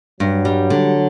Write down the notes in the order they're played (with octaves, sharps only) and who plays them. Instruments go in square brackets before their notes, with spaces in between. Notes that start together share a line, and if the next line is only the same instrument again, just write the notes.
[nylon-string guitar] G2 [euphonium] F#3
[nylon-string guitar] G3
D3